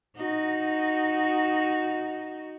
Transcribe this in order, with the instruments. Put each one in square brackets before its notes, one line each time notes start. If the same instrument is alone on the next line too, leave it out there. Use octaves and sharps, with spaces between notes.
[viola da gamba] D#4 F#4